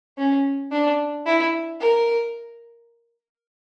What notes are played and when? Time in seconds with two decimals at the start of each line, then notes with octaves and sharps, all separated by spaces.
0.18 C#4
0.72 D4
1.26 E4
1.80 A#4